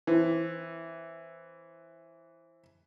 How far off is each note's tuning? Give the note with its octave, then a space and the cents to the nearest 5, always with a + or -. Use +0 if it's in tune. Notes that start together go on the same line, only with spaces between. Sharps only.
E3 +0 C4 +15